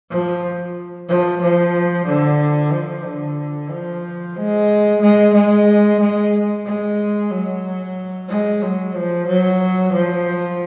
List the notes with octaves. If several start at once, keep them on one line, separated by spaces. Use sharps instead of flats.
F3
F3
F3
D3
F3
D3
F3
G#3
G#3
G#3
G#3
G#3
F#3
G#3
F#3
F3
F#3
F3